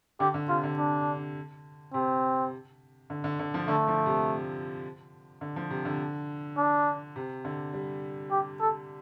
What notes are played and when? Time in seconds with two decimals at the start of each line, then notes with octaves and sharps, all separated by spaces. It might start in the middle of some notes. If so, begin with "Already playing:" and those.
0.20 D3 G4
0.34 D3
0.49 C3 F4
0.64 D3
0.78 D4
1.94 C3 C4
3.10 D3
3.24 D3
3.39 D3
3.54 F3
3.68 D3 A3
3.88 F3
4.06 C3
5.41 D3
5.56 F3
5.70 C3
5.85 D3
6.57 D4
7.16 C3
7.45 D3
7.73 G3
8.31 G4
8.61 A4